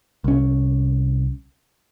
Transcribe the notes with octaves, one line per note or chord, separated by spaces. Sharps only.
C2 C#4